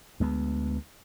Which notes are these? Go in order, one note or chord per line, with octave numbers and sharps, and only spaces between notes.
D2 G#3 B3